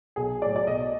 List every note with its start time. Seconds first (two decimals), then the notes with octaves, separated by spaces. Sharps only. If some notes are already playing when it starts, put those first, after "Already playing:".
0.16 B1 G#4
0.42 A2 F#3 D5
0.56 D5
0.67 B1 D#5